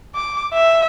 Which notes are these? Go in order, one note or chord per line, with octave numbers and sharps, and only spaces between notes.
D6
E5